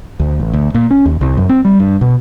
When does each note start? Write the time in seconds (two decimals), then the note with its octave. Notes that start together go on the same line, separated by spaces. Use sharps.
0.20 D2
0.40 A1
0.53 D2
0.74 A#2
0.91 C#4
1.06 D#2
1.21 C2
1.37 F#2
1.49 C4
1.65 G3
1.80 G2
2.01 B2